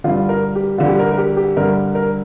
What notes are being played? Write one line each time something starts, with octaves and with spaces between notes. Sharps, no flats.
G2 D3 F4
A#4
G4
G2 D3 F4
G4
A#4
A#4
G4
G4
G2 D3 A#4
A#4